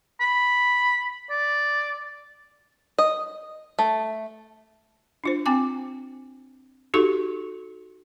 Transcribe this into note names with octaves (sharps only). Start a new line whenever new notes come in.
B5
D5
D#5
A3
D4 F4 C5
C4 G5 G#5 D6
D#4 F#4 G4 A4 C#6